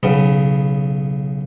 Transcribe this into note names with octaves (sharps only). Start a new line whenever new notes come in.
B1 C#3 B3